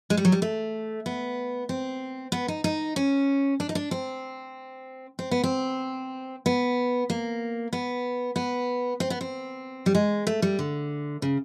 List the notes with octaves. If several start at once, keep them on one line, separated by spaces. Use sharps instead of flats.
G#3
G3
F#3
G3
A3
B3
C4
B3
D#4
D#4
C#4
D4
D#4
D4
C4
C4
B3
C4
B3
A#3
B3
B3
C4
B3
C4
G3
G#3
A3
G3
D3
C#3